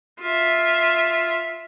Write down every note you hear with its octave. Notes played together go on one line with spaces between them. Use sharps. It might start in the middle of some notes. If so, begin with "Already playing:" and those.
F4 E5